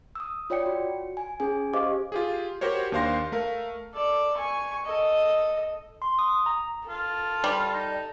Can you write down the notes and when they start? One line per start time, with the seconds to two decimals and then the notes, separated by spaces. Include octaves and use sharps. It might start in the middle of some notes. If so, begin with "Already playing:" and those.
0.15 D#6 E6
0.50 F4 C#5 D5 G5 C#7
0.66 F#4
1.17 G#5
1.40 C#4 G#4 G#5
1.73 G4 C5 D#5 F5 D6
2.12 F4 G4 G#4
2.61 F#4 G4 A#4 C5 C#5
2.92 D#2 D4 C5 F5 C6 A#6
3.32 A3 A#4 F5
3.94 A4 D5
4.37 G#5 C#6
4.85 A4 D#5
6.02 C6
6.19 D#6
6.46 A#5
6.89 F4 A4
7.44 G3
7.73 D#4